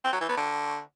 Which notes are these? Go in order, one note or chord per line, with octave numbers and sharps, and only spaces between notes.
C4
F#3
E3
B3
D3